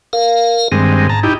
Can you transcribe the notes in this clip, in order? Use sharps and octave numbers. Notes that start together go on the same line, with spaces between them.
A#4 F5
G2 D#3 G#3 C4
G#2 A5 A#5
D#4 E4 G4